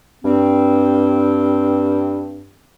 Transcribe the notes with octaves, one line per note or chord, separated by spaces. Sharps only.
G2 C4